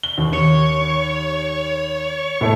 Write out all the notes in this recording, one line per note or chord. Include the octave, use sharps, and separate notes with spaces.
G7
D#2
C#5
A2 A3